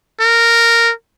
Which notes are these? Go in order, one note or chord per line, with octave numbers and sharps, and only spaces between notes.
A#4